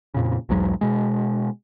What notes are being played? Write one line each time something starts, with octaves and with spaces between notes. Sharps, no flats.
F2 A#2 C#3
B1 E2 G#2 F#3
B2 G#3